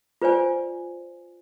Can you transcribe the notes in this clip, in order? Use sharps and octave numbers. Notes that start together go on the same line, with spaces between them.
F4 B4 C5 D5 G#5